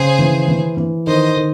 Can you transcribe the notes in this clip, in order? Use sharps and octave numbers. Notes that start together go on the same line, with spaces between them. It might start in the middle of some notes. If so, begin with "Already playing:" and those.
Already playing: C#3 G#4 C5
E3
E3
E3
D#3 C5 D#5
D#3